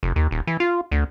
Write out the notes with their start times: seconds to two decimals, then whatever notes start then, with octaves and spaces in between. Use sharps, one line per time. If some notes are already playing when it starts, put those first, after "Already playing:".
0.03 F1
0.16 D#2
0.31 D#1
0.47 E3
0.60 F4
0.91 D2